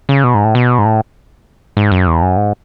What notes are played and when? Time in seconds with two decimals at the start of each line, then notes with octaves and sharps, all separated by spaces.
0.09 C#3
0.24 B2
0.35 G#2
0.44 A2
0.55 B2
0.79 G#2
0.85 A2
1.77 G#2
1.92 F#2
2.07 E2
2.22 F#2
2.37 G#2